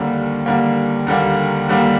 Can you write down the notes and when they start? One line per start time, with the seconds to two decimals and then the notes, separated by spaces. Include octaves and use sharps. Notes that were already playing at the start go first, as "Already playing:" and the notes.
Already playing: D#2 D3 G3 A#3
0.46 D#2 D3 G3 A#3
1.07 D#2 D3 G3 A#3
1.69 D#2 D3 G3 A#3